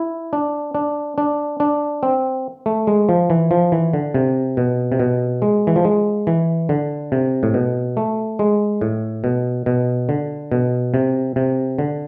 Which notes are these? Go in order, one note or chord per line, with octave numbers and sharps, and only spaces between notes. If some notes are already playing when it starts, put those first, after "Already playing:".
Already playing: E4
D4
D4
D4
D4
C4
A3
G#3
F3
E3
F3
E3
D3
C3
B2
C3
B2
G#3
E3
F3
G#3
E3
D3
C3
A2
B2
A3
G#3
A2
B2
B2
D3
B2
C3
C3
D3